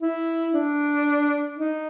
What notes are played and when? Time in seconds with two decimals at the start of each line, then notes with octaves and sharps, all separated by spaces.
0.02 E4
0.54 D4
1.58 D#4